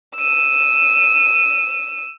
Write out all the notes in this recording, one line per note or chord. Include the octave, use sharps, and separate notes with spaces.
E6 D#7